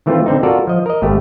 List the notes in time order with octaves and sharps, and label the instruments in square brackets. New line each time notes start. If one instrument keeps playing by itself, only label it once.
[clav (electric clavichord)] D#3 E3 A3 C4 F4
D3 C4 D#4
F4 F#4 A4 A#4 D5
F3 D#5
A#4 D#5
G#1 A3 G4